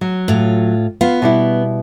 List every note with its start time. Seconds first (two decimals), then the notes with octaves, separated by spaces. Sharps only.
0.01 F#3
0.28 A2 F4
1.01 B3 F4 F5
1.22 B2 G3 E4